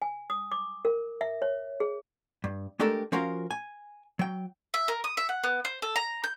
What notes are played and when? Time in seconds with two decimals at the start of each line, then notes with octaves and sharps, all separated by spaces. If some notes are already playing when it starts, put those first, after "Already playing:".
0.02 G#5
0.30 D#6
0.52 D6
0.85 A#4
1.21 E5
1.42 C#5
1.80 G#4
2.44 G2
2.80 G#3 A3 D4 G4 A4 A#4
3.12 F3 C#4 F4 F#4 A#4 F5
3.51 G#5
4.19 F#3 G5
4.74 E5
4.88 A#4
5.04 D#6
5.17 E5
5.29 F#5
5.44 B3
5.65 C5
5.82 A4
5.96 A#5
6.24 G6